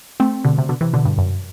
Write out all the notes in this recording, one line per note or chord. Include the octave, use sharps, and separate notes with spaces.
A3 C4
B2 D3
C3
B2 D3
C3 E3
B2 D3
G2
F#2